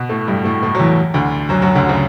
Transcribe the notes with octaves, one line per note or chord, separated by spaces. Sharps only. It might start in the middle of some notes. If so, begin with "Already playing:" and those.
Already playing: B2 B3
A2 A3
G2 G3
A2 A3
A2 A3
F#3
E2 E3
D2 D3
F#2 F#3
F#2 F#3
D2 D3
C#3